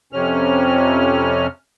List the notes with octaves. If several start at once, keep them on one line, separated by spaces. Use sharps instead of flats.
F2 C3 C#4 F6